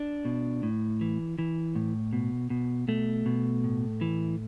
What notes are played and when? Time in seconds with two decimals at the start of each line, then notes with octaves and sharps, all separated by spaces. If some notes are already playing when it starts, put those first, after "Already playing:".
Already playing: D4
0.25 B2
0.63 A2
1.01 E3
1.39 E3
1.75 A2
2.13 B2
2.50 B2
2.88 B2 A3
3.26 B2
3.64 A2
4.01 E3